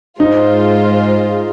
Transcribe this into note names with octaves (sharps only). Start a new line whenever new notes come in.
G#2 G#3 D#4 F4 C5